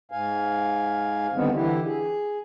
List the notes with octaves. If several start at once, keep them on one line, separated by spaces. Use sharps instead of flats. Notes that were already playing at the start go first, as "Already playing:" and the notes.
G#2 F5 G#5
D3 D#3 G3 B3 C4
D3 E3 E4 G4
G#4